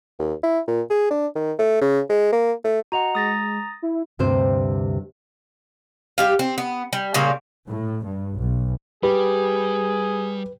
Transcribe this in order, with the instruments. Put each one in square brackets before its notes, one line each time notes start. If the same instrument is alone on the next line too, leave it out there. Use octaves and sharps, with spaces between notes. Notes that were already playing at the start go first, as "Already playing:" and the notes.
[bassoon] D#2
E4
A#2
G#4
D4
D#3
A3
C#3
G#3
A#3
A3
[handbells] F#4 D#5 F#5 [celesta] A#5 F7
[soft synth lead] G#3 [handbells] D#6 A6 A#6
[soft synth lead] E4
[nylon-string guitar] D2 G2 C3 C4 C5
[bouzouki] G3 G4 F5
C4
B3
G3
A#2 C#3 G3 A#3
[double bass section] A2
G2
B1
[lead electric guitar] G3 [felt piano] G4 [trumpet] G#4 [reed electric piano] B4